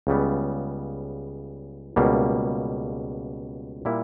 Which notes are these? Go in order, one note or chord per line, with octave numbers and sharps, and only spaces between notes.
C#2 C#3 G3 B3
C#2 B2 G3 A#3
A#2 G3 A#3 E4